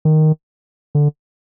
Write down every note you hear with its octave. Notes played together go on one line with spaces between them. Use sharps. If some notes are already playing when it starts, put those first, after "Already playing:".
D#3
D3